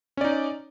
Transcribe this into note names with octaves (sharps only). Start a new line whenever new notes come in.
C#4 D#4 D5